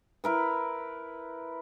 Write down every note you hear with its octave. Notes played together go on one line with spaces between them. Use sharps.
E4 A#4 B4